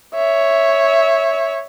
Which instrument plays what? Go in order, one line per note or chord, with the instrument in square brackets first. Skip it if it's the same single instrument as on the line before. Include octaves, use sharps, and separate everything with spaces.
[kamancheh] C#5 E5